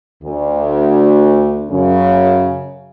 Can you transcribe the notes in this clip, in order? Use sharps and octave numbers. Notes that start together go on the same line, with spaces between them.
D2
F#2 C#3